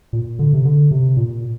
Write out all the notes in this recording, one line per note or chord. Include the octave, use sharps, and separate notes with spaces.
A#2
D3
C3
D3
C3
A#2